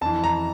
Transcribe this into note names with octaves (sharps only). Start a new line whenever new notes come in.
F2 E3 A5
A#5